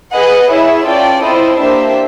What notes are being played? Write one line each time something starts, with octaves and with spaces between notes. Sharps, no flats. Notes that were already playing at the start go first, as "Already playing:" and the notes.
G#4 B4 D#5 F#5
E4 G#4 C#5 E5
C#4 F4 A4 D5 G5
C4 E4 A4 C5 D#5
A#3 D4 G4 C5 E5